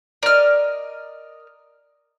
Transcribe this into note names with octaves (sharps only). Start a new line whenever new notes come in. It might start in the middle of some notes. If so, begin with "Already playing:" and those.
A#4 D5 D#5 F6